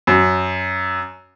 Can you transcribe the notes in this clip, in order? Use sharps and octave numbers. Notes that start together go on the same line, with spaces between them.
F#2